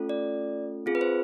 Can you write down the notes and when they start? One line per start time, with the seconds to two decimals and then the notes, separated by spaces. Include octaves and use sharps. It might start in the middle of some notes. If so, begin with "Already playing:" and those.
Already playing: A3 C#4 F4 A4
0.09 D5
0.86 C4 F4 G#4
0.95 B4
1.01 C5